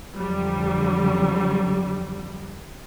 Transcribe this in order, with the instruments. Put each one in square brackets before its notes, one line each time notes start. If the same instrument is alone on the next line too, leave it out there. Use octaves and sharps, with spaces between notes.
[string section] F2 D3 F#3 G3